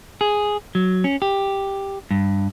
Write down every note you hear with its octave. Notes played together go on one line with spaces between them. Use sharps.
G#4
F#3
C#4
G4
G2